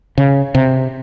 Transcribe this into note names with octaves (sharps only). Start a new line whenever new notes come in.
C#3
C3